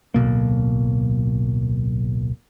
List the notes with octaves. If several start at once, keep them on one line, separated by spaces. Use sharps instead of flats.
D1 B1 B2 A#3